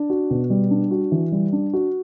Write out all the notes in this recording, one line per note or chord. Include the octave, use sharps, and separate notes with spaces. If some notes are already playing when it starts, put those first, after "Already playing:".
Already playing: D4
F#4
B2
G3
D4
F#4
E3
G3
D4
F#4